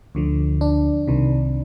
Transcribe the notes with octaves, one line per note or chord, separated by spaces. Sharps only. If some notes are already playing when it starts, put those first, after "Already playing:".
D2 D3 F3
D4
C2 C3 D#3